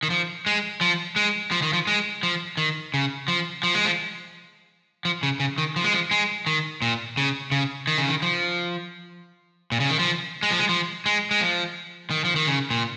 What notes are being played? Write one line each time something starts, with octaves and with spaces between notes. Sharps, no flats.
D#3
F3
G#3
F3
G#3
F3
D#3
F3
G#3
F3
D#3
C#3
F3
F3
G#3
F3
F3
C#3
C#3
D#3
F3
G#3
F3
G#3
D#3
A#2
C#3
C#3
D#3
C#3
D#3
F3
A#2
C#3
D#3
F3
G#3
F3
G#3
F3
G#3
G#3
F3
D#3
F3
D#3
C#3
A#2